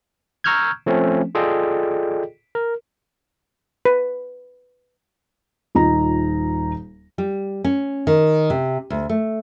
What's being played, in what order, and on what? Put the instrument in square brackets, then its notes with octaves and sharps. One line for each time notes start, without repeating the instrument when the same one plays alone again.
[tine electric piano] A#5 C#6 E6 F6 G6 G#6
F3 A3 C4 C#4
F4 G#4 A4 D5 D#5 G5
A#4
[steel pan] B4
[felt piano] D#1 D#4 F4 A#5
[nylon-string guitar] G3
C#4
D#3
C3
D2
A3